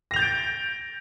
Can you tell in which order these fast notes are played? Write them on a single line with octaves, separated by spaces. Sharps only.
A#6 F7 G6 A6 D7